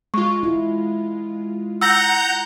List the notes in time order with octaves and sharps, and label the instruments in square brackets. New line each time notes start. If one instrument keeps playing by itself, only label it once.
[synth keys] G#3 F4 [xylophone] C#6
[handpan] E4
[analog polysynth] F#5 A#5 G6 [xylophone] E6 A#6